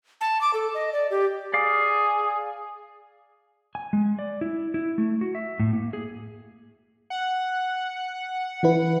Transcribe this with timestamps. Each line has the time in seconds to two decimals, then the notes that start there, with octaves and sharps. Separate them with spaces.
0.21 A5
0.41 D6
0.54 A4
0.74 D#5
0.93 D5
1.11 G4
1.54 G#4 D5 F5 D6
3.75 G#5
3.93 G#3
4.19 D5
4.41 E4
4.74 E4
4.98 A3
5.21 F#4
5.35 E5
5.60 A2
5.73 A#3
5.93 G#4
7.10 F#5
8.63 E3 E4 B4